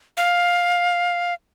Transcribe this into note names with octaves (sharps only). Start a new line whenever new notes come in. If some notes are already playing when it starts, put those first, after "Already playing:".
F5